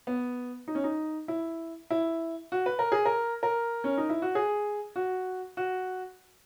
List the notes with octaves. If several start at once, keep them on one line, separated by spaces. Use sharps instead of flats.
B3
D#4
C#4
D#4
E4
E4
F#4
B4
A#4
G#4
A#4
A#4
C#4
D#4
E4
F#4
G#4
F#4
F#4